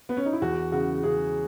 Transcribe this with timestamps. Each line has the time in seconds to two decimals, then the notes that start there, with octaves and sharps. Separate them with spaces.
0.09 B3
0.17 C#4
0.26 D#4
0.33 E4
0.42 E2 F#4
0.72 C#3 F#4
1.03 C#3 G#4